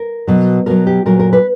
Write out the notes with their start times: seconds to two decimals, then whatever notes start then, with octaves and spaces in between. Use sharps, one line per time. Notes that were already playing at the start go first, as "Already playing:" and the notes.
Already playing: A#4
0.27 B2 F#3
0.66 B2 F#3 A#4
0.87 G4
1.06 A#2 F#3 A#4
1.19 A#4
1.33 B4